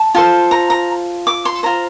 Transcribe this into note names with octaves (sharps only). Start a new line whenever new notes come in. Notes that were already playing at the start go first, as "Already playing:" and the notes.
Already playing: A5
F4 A4 C5
A#5
A#5
D6
C6
F4 C5 A#5